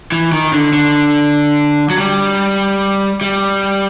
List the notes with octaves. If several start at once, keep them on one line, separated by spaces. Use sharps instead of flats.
E3
D#3
D3
D3
F#3
G3
G3